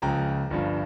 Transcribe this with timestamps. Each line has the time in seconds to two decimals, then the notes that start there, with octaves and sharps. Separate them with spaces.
0.02 C#2 C#3 F3 G5 A#5
0.50 G1 G2 F3